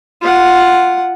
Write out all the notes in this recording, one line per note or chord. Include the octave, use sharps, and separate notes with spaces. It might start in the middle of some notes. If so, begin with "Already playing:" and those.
F4 F#5